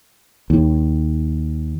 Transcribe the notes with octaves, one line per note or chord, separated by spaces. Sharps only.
D#2